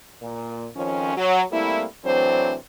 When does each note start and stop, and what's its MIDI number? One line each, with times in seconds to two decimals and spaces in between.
0.22 0.67 46
0.76 1.15 41
0.76 1.15 51
0.76 1.15 53
0.76 1.15 61
1.17 1.42 54
1.52 1.85 55
1.52 1.85 57
1.52 1.85 58
1.52 1.85 60
1.52 1.85 64
2.05 2.56 45
2.05 2.56 52
2.05 2.56 54
2.05 2.56 60
2.05 2.56 62
2.05 2.56 72